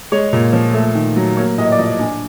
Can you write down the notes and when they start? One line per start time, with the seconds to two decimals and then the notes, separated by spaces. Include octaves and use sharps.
0.12 G#3 C#5
0.33 A#2
0.53 F3
0.74 A3
0.95 D#3
1.16 F#3
1.37 A#3 C#5
1.58 A2 D#5
1.72 D5
1.79 F3 D#5
1.99 D4 G#5